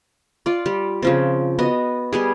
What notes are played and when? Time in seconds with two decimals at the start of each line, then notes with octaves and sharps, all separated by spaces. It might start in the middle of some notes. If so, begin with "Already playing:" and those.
0.46 F4 D5
0.66 G3
1.02 C#3 F3 C4
1.59 B3 F#4 D#5
2.13 G3 B3 G#4